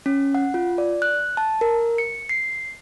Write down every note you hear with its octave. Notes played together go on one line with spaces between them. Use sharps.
C#4
F#5
F4
D5
F#6
A5
A#4
C#7
C7